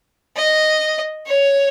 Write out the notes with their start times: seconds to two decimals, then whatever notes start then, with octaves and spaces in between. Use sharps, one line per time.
0.37 D#5
1.27 C#5